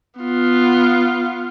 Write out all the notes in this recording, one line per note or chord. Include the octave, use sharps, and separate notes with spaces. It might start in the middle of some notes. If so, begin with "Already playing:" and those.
B3 F4